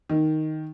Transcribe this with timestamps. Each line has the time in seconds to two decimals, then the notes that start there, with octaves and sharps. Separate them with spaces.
0.09 D#3